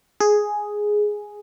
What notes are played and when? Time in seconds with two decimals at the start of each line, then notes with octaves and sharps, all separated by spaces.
0.20 G#4